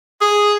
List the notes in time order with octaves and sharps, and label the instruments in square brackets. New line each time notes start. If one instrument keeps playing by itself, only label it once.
[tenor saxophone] G#4